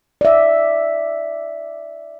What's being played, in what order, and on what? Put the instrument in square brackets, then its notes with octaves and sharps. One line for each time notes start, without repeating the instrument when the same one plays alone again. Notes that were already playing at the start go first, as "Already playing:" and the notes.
[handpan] D5 E5